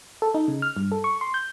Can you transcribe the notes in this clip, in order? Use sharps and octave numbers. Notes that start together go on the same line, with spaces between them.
A4
D#4
C#3
F6
G2
A4
C#6
C6
G6